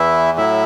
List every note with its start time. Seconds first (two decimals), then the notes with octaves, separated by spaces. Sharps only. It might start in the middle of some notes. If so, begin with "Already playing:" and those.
Already playing: E2 E3 E4 E5
0.38 A2 F#3 E4 E5